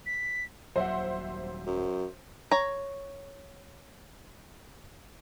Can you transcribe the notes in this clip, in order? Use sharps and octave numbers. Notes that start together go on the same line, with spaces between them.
B6
D#1 F#3 C5 E5 F#5
F#2
C#5 A#5